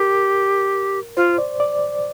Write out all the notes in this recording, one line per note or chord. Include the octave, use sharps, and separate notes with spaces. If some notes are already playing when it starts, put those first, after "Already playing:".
Already playing: G4 A#4
F4 C5
D5
D5